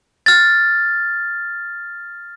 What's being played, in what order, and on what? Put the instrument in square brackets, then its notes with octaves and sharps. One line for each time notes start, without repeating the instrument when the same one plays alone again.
[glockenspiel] F6 A6